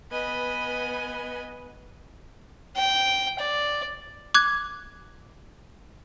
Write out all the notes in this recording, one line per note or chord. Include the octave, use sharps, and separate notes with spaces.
B3 B4 D#5 G#5
G5
D5
D6 F#6 G#6